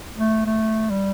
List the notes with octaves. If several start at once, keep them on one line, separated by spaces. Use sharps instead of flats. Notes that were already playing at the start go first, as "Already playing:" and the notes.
A3
A3
G3